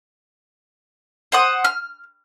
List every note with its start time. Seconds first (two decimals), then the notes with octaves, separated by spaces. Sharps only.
1.32 C5 F#5 D#6
1.64 F6